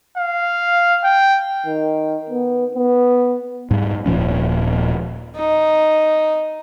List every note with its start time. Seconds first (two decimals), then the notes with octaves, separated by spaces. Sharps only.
0.17 F5
1.04 G5
1.66 D#3
2.30 B3
2.75 B3
3.71 G#2 G3
4.06 D#1 A#2 F3 C#4
5.36 D#4